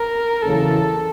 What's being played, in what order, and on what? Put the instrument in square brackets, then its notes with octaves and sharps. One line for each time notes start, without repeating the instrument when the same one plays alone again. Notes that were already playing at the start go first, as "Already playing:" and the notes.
Already playing: [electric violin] A#4
[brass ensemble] F#1 E2 C#3 E3 [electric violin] A4